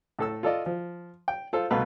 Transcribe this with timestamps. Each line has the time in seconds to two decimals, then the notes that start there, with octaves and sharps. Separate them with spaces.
0.19 A2 A4 E6
0.43 F4 A4 D5 D#5
0.66 F3
1.28 G5
1.53 F4 A4 C5
1.70 C2 B2 A3 B4 D#5 F5